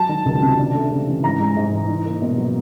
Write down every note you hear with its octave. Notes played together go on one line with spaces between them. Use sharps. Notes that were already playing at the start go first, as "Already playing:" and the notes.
Already playing: F#3 A5
D#3
C#2
C3
D4
A3
C#3
E3
G#2 A#5
G#3
G#2
E3
D#4
A#3
B2
F#3